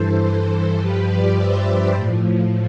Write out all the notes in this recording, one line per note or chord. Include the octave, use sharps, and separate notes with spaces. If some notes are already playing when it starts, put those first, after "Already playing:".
Already playing: G2 E3 A4 C5
A4 C5
G2 F3 G4 B4
B4 D5
C5 E5
G4 B4
A2 F3